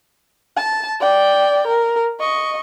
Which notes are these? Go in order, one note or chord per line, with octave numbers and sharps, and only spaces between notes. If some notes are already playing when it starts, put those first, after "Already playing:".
A5
D5 G5
A#4
D#5 C#6